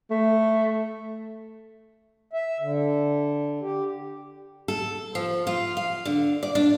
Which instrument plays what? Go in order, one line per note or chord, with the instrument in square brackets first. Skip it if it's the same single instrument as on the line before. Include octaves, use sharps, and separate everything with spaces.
[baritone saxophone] A3
[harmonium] E5
D3
G4
[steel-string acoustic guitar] A4
F3
F4
F5
D3
D5
D4